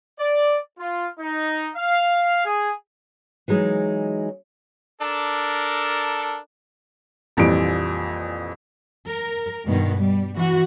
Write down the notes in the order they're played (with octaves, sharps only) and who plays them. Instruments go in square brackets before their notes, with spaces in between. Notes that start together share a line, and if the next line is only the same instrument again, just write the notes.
[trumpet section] D5
F4
D#4
F5
G#4
[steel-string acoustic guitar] E3 F#3 G#3 D#4
[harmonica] D4 A4 A#4
[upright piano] A#1 F2 E3 G3 D7
[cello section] A#4
G2 B2 D#3
G3
E3 F#4